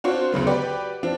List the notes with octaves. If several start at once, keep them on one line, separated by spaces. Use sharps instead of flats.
C4 D4 F4 F#4 C5 C#5
D2 C#3 F#3 B3
F#4 G4 B4 D5
F3 C4 D4